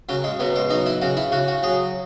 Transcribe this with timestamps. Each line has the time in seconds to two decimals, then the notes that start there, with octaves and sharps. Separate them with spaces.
0.09 C#3 F#3
0.24 G#3
0.40 B2 F#3
0.56 G#3
0.70 F#3 D#4
0.86 E4
1.01 C#3 F#4
1.17 E4
1.32 C#3 F#4
1.48 F#4
1.63 F#3 G#4